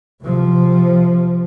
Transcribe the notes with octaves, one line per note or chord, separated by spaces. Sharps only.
C3 F3